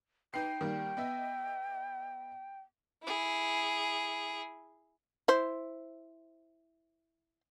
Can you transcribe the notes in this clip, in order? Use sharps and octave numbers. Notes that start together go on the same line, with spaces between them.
D#4 B4 G5 C7
D#3 G3 A#3
B3 D#5 E5
E4 G#4
E4 C5